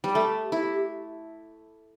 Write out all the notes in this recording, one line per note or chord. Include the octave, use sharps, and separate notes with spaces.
G3 G4
A3 A4
G4
E4